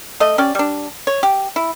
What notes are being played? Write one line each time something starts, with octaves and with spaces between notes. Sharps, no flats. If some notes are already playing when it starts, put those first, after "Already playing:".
A3 D#5
C#4 G4 D5
G3 D4
C#5
G4
E4